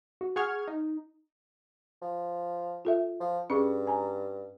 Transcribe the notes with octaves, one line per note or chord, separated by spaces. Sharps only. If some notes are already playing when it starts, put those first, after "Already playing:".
F#4
G#4 F#5 C#6 F6 G#6
D#4
F3
F4 A4 E5
F3
G2 C#4 G#4 C#6
G#5 A#5